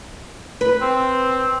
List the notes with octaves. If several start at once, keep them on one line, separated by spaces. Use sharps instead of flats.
B4
C4